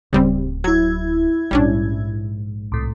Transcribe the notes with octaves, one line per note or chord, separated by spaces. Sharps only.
D1 C#3 G3 C4
F#3 E4 G#6
A#1 G#2 G3 C#4 D4
C2 A2